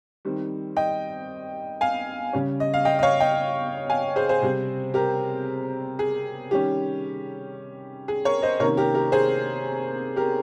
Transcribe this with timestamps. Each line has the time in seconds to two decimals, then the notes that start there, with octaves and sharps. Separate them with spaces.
0.25 D#3 G3 C4
0.76 D#5 G5
1.81 F5 G#5
2.33 C#3 G3 C#4
2.60 D#5
2.74 F5
2.85 D#5 G5
2.99 D#5
3.03 C#5 F5
3.20 D#5 G5
3.90 F5 G#5
4.16 G#4 C5
4.29 G#4 C5
4.42 C3 G3 C4
4.94 G4 A#4
5.99 G#4
6.51 D#3 G3 C#4 G4
8.08 G#4
8.25 A#4 C#5
8.42 C5 D#5
8.60 C3 D#3 A#3 C#4 A#4 C#5
8.77 G4 A#4
8.95 G4 A#4
9.12 G#4 C5
10.16 G4 A#4